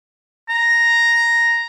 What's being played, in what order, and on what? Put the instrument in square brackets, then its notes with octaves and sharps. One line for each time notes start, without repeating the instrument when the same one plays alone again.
[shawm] A#5